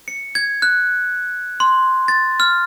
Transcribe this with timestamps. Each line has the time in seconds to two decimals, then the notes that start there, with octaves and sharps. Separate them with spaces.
0.08 C#7
0.35 G#6
0.62 F#6
1.60 C6
2.08 A6
2.40 F6